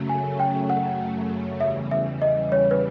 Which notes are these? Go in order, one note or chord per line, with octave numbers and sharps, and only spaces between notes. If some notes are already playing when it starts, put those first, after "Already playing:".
Already playing: F#2 C#3 F#3 A3
G#5
G5
F#5
E2 C#3 E3 G3 E5
E5
D#5
C#5
B4